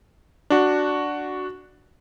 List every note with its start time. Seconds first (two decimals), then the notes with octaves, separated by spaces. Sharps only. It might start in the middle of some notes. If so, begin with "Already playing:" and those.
0.50 D4 F#4